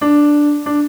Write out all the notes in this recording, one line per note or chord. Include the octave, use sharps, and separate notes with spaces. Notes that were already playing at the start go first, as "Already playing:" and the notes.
D4
D4